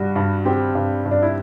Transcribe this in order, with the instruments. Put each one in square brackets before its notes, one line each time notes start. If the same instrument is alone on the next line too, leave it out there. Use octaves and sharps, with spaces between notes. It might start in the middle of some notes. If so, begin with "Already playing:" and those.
Already playing: [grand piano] G2 G3 [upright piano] F#4
[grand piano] G2
[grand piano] C4 [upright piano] G4
[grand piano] G2
G2
[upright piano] D4
E4